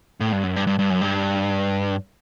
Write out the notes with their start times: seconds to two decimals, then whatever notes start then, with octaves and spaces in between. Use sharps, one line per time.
0.20 A2
0.32 G2
0.43 F#2
0.56 G2
0.67 G2
0.79 G2
0.90 F#2
1.01 G2